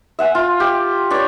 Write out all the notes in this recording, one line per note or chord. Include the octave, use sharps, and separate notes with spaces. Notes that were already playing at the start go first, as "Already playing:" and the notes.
E5 F#5 G#5
F4
G4
D4 C#5